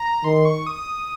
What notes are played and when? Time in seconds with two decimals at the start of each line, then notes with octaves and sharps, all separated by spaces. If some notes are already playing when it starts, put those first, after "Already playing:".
Already playing: A#5
0.24 D#3 C6
0.45 C#6
0.67 D#6